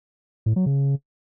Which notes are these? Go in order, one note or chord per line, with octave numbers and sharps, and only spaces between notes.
A2
F#3
C#3